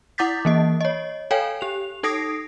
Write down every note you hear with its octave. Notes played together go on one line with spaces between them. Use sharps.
E4 F#5 D6 G6 A6 B6
E3 A#3 D#5
C#5 D#5
A4 C#5 F5 G5 G#5
G4 F7
D#4 A4 D#6 A#6 C7 D7